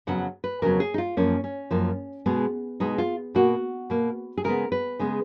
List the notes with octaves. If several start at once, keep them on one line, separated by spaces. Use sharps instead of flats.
F2 C#3 F#3 B3 F#5
B4
F2 C#3 F#3 B3 A#4
G#4
D#4
F4
F#2 F3 A#3 C#4
C#4
F#2 F3 A#3
B2 G#3 B3
B2 G#3 B3 D#4
F4
B2 A#3 F#4
B2 A#3
G#4
C#3 G#3 B3 A#4
B4
C#3 G#3 B3